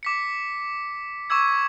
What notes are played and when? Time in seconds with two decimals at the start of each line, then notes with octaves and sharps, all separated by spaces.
0.03 D6 B6 C#7
1.30 C#6 D6 E6 G#6